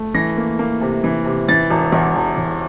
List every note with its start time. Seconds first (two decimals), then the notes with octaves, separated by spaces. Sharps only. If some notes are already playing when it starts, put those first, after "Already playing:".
Already playing: A3
0.15 E3 A#6
0.37 A#3
0.59 A#3
0.81 C3
1.04 E3
1.26 C3
1.49 E3 A6
1.70 E1
1.92 E2
2.15 E1
2.37 E1